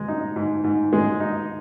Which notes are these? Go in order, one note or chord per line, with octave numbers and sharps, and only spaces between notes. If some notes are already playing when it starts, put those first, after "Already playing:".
Already playing: G#3
D#4
G#2
G#2
G#3
D#4